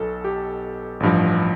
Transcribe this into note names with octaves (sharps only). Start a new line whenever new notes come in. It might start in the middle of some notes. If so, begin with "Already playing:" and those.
Already playing: B1 B2 A4
G4
A1 G2 F3